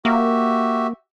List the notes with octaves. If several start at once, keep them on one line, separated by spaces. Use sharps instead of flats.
A#3 F#4 G4 E5